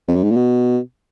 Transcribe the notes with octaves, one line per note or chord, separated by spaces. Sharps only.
F2
F#2
G#2
A#2
B2